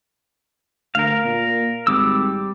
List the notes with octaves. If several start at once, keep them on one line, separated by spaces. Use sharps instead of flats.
D2 A#4 F5
A#2
G#1 G3 D6 E6